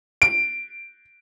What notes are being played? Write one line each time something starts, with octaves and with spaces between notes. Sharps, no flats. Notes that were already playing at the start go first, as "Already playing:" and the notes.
D7